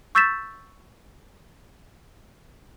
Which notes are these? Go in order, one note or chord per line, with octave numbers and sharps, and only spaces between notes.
C#6 E6 G6 A6 B6 E7